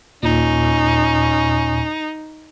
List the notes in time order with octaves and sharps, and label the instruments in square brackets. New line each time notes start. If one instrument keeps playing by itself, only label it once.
[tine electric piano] D#2 A#2 [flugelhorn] C#4 [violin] D#4